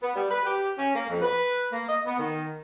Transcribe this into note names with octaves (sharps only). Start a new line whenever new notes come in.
B3
G3
B4
G4
C#4
A#3
F2
B4
A#3
D#5
B3
D#3